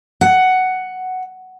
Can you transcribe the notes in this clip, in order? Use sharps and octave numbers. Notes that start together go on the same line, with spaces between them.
F#5